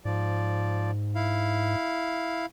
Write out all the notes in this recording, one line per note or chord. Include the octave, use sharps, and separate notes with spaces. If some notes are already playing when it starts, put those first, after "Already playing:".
G#2 F3 D5
E4 F5